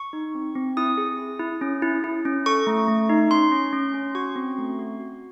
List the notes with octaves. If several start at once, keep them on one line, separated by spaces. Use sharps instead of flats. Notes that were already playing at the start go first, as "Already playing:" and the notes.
Already playing: C#6
D#4
C4
C4
E4 D#6
G#4
G#4
E4
C#4
E4
E4
C#4
A4 C#6
A3
A3
D#4
C#4 C6
C#4
C#4
C#4
F#4 C#6
C4
A3
F#4
F#4